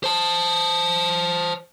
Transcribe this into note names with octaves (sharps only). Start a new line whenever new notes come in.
C5 A5